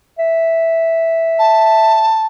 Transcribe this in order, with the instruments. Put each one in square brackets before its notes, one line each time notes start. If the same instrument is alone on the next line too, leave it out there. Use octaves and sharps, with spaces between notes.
[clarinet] E5
[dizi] A5